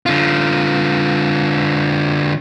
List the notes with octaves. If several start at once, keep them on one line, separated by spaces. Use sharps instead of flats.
D3 F4